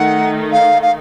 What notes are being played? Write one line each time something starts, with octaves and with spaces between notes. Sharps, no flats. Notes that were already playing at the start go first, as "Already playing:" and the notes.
Already playing: D#3 A3 D#4 F#5
F5
F5